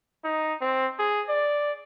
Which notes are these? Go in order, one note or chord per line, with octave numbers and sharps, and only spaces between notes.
D#4
C4
G#4
D5